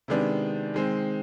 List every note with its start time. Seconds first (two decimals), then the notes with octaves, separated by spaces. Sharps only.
0.08 C3 D#3 G#3 B3 D4
0.74 D#3 G#3 C4